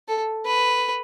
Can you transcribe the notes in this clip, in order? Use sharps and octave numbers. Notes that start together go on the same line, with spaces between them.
A4
B4